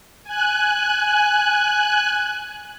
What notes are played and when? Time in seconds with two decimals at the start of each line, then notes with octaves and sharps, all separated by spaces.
0.24 G#5 F#6